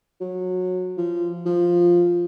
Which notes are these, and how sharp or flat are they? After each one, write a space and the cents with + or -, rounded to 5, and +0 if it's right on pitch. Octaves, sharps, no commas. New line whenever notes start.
F#3 -20
F3 -20
F3 +0